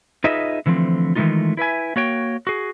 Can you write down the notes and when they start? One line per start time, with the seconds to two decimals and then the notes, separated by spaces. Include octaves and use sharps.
0.24 D#4 F4 G#4 B4 D#5 E5
0.66 D3 E3 F3 A3 C4
1.15 D#3 E3 G#3 A3 D#4 F4
1.57 E4 B4 E5 G#5
1.96 A#3 F#4 C#5 G5
2.47 F#4 G#4